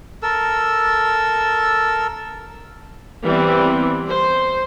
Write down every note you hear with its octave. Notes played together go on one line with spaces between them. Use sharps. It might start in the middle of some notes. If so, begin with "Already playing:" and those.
A4 A#4 E6
E3 G3 B3 C4
C5